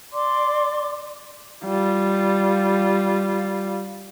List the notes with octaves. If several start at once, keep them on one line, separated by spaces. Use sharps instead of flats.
D5 C6 D6
G3 F4